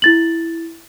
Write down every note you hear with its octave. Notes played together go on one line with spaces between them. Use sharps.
E4 A6 F#7